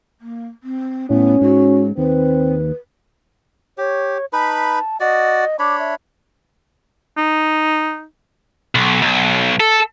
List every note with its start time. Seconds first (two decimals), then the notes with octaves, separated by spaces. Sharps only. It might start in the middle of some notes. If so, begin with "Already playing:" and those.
0.21 A#3
0.63 C4
1.10 A2 B3 C#4
1.41 G#2 F#4
1.98 D#2 C4 B4
3.78 G4 C#5
4.33 D#4 B4 A5 B5
5.00 F#4 D5 D#5
5.59 D4 C#5 B5 D6
5.79 E5
7.17 D#4
8.75 B1
9.02 B1
9.60 A4